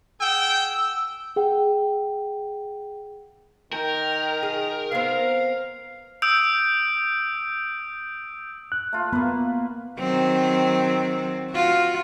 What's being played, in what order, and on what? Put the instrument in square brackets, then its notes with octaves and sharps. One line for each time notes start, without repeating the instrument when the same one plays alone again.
[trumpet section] G#4 F#5 G5 [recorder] E6
[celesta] G#4 F#5 G5
[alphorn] D#3 [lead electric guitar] A#4 [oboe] G5
[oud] G#4
[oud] B3 C4 [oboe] F5
[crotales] D#6 E6 G6 D7
[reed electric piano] F#6
[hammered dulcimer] A3 F4
[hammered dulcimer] A#3 B4 [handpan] B3
[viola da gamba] D#3 F#3 C4
F4 F#4